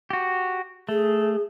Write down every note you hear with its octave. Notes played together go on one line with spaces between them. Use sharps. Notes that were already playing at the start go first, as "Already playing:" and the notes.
F#4 G4
A3 G#4